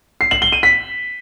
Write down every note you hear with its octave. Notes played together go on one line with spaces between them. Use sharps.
C7
F#7
G7
D#7
B6